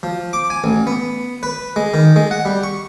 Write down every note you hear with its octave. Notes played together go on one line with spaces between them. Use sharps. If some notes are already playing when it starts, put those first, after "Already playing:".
F3
D6
G#5
A1
B3
B4
G#3
D#3
G#3
F#5
G3
C#6